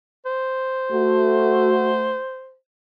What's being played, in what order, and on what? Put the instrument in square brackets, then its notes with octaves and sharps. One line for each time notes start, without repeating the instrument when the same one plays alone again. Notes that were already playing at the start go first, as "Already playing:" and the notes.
[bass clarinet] C5
[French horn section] A3 F#4